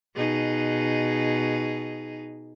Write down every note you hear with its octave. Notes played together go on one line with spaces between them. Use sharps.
B2 D#4 G#4